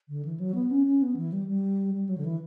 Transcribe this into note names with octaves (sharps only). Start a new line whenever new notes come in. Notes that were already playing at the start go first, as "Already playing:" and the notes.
D3
E3
F#3
B3
C#4
C#4
B3
E3
G3
G3
G3
F#3
D3
E3